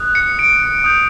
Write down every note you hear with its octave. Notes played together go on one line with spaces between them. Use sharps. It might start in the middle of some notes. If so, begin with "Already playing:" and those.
Already playing: D#6 F#6
C#7
D7
D#6 G6